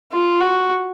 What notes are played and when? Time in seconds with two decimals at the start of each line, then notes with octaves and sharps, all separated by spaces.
0.12 F4
0.41 F#4